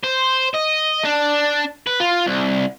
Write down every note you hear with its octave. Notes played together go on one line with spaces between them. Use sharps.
C5
D#5
D4
B4
F4
C2